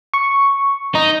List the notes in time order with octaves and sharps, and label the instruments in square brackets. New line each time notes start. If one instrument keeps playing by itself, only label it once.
[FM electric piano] C#6
[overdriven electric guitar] D#4 [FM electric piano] A#5